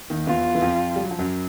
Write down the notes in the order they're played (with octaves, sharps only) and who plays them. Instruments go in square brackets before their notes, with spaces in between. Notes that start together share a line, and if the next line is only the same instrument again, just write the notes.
[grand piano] D#2 D#3
[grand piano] E2 E3 [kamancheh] F4
[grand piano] E3
F2 F3
G3
F#3
F3
F#2 F#3